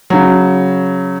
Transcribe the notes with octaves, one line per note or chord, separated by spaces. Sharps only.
C#3 F#3